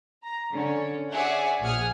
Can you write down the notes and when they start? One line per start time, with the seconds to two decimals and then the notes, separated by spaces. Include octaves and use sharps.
0.23 A#5
0.53 D3 C#4 C#5
1.14 G#4 C#5 D5 E5 F#5 G#5
1.61 A#1 G#4 F#5 D#6 F6